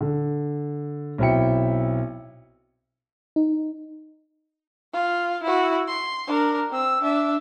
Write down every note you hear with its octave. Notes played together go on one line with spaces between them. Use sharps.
D3
B1 C4 E4 E5 G5 C#7
D#4
F4
E4 F#4
C6
D4 A#4
C4 E6
D4 E5